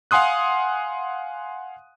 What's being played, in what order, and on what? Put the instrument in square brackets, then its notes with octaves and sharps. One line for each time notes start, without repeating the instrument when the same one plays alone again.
[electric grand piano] F5 F#5 G#5 C6 D#6 F#6